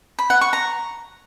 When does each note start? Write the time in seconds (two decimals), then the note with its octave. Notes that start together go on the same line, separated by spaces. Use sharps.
0.19 B5
0.30 F#5
0.41 C#6
0.53 A#5